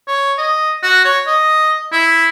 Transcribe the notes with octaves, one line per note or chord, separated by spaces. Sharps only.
C#5
D#5
F#4
C#5
D#5
E4